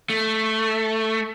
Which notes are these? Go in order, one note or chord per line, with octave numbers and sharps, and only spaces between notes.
A3